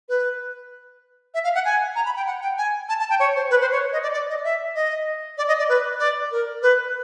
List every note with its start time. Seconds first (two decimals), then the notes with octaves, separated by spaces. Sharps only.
0.09 B4
1.34 E5
1.44 F5
1.55 F#5
1.65 G#5
1.95 A#5
2.06 B5
2.16 G5
2.27 F#5
2.42 G5
2.58 G#5
2.89 A5
3.00 A5
3.10 G5
3.20 C#5
3.35 C5
3.51 B4
3.61 C5
3.71 C#5
3.93 D#5
4.02 D5
4.13 D5
4.30 D#5
4.44 E5
4.75 D#5
5.38 D5
5.48 D#5
5.59 D5
5.69 B4
5.99 D5
6.31 A#4
6.62 B4